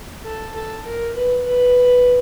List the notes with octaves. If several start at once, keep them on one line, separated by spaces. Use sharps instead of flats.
A4
A4
A#4
B4
B4